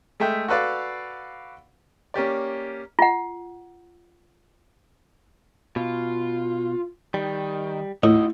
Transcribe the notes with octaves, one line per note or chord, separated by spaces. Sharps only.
G#3 A3 E5 G5
F#4 A4 B4 D5 F5
A#3 C#4 G4 D5
F4 F#5
B2 F4
D#3 G3
A2 D#4 E4 F#4 D#5